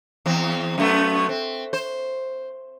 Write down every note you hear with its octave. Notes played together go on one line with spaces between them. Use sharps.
E2 C4
F#2 A3 B3
C4
C5